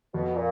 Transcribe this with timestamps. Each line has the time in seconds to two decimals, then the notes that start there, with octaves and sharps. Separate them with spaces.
0.14 F2 B2
0.36 A#2